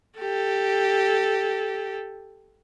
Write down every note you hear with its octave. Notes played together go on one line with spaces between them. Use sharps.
G4 A4